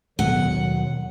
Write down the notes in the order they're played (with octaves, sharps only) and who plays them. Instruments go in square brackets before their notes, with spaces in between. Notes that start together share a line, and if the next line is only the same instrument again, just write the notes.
[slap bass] D#2 B2 B3 [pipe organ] D#3 F#3 [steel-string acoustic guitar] F#5